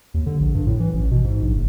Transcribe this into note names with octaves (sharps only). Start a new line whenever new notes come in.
D#2
D3
A#1
G2
A2
E3
A1
B2
G#2
A#1
F#1